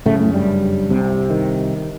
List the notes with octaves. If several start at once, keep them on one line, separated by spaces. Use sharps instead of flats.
F#2 A2 C#3 A3
A2 A3
G2 G3
C2 C3
D#3